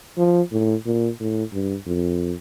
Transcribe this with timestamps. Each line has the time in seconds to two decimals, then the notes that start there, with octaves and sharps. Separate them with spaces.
0.18 F3
0.52 A2
0.86 A#2
1.20 A2
1.53 G2
1.86 F2